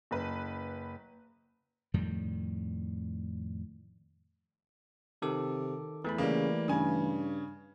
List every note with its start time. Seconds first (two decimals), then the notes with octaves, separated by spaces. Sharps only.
0.11 F#1 B4
1.94 F2 A2 D#3 G3
5.22 C3 D#3 A4 D6
6.04 E2 E3 A3 B5
6.18 C#3 G3 A#3
6.68 G2 C#3 G#5